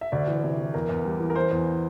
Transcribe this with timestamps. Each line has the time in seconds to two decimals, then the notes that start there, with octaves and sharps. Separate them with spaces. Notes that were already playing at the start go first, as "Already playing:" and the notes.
0.01 E5
0.12 D2 D5
0.28 E3
0.43 C3
0.59 E3
0.74 E2 A#4
0.89 E2
1.05 G3
1.20 E3
1.30 A#4
1.36 E3 C5
1.51 E2